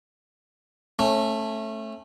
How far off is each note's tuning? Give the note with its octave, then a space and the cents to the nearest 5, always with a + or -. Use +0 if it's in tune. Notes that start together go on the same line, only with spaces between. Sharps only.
A3 +0 C#4 -25